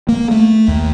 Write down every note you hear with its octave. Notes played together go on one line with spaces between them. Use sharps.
A#3
A3
D#2